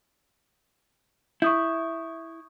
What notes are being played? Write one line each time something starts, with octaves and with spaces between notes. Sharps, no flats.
E4 C#6 D#6 G6